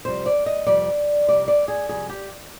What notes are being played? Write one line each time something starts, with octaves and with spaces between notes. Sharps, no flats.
F2 C3 G3 C5
D5
D#5
F2 C3 G3 D5
F2 C3 G3 D5
D5
G#4
F2 C3 G3 G#4
G4